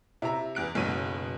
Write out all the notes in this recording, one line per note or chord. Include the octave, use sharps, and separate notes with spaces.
C3 E4 A#5
E2 F#6 D7
F#1 B1 B2 F#3 D#7